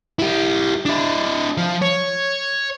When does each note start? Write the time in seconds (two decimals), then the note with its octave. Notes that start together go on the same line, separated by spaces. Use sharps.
0.19 E4 G4
0.85 D4 E4
1.57 F3
1.82 C#5